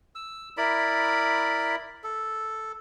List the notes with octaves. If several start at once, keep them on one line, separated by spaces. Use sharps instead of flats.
E6
E4 A#4 D5 B5
A4